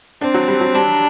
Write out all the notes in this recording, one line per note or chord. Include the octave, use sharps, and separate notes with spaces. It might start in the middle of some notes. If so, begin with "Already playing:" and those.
C4 D4
F#3
G3
F#3
G3 D4